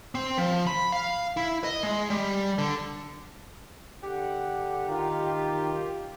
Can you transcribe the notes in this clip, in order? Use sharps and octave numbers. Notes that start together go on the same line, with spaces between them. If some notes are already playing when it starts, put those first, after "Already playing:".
C4
F3
B5
F5
E4
D#5
G#3
G3
D3
D3 G4 F#5
D#3 D#4 F4